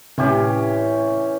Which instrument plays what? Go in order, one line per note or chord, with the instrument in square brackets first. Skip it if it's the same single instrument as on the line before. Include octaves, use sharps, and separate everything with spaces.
[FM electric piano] A2 C3 [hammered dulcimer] E3 C#4 G4